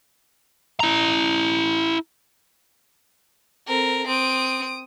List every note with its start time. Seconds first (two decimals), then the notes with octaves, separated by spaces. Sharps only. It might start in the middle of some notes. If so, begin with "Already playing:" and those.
0.80 E4 A#5
3.67 C4 A4 A#4
4.07 C4 D#6 D7